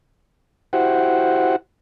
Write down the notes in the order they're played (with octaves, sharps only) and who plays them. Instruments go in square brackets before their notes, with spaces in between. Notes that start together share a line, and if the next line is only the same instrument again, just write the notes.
[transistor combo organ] E4 F#4 G4 C5 F#5